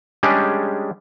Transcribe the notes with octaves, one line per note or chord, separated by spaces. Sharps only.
G3 G#3 C#4 D4 G4 G#4